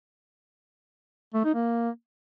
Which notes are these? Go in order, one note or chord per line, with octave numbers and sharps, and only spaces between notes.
A3
D#4
A#3